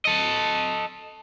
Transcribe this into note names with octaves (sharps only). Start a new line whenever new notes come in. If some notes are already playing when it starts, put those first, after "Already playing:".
A4 D#5